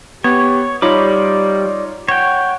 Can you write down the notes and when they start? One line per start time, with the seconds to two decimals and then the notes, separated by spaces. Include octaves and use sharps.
0.24 B3 G4 C#5
0.82 G3 D#4 F4 C#5 D5 B5 D6
2.08 C#5 F#5 G5